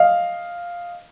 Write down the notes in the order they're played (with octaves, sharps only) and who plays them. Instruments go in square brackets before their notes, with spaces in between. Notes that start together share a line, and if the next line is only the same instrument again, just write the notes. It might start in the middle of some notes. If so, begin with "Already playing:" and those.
Already playing: [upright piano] D#5 F5